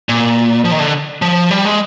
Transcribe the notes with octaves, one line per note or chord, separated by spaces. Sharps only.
A#2
F3
D#3
D3
F3
G3
G#3